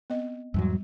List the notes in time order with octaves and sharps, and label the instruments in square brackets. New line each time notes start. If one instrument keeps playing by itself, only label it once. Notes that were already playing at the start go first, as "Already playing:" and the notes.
[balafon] B3 C4 D#5
[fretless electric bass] E2 G#2 F#3 [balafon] G3